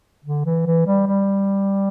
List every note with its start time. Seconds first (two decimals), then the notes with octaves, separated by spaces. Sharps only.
0.24 D3
0.45 E3
0.67 E3
0.87 G3
1.07 G3